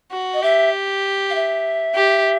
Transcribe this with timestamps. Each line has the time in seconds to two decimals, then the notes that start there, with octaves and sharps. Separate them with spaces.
0.12 F#4
0.33 D#5
0.43 G4 E5
1.30 F5
1.35 E5
1.95 G4